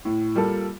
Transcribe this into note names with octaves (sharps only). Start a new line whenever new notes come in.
A2
G3 A#3 F4 A4